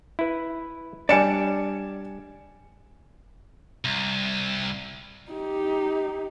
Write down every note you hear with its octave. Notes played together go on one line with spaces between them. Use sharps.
E4 B4
G3 D4 D5 G#5 C#7 E7
C2
D#4 G4